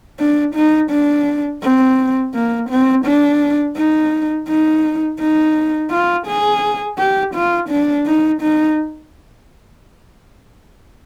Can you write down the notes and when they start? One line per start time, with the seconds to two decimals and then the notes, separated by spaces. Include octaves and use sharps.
0.20 D4
0.55 D#4
0.91 D4
1.63 C4
2.34 A#3
2.70 C4
3.05 D4
3.77 D#4
4.49 D#4
5.20 D#4
5.91 F4
6.28 G#4
6.99 G4
7.35 F4
7.70 D4
8.07 D#4
8.42 D#4